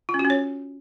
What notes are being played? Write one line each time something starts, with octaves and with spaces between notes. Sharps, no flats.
F4
C#4
F#4
C#4
C#5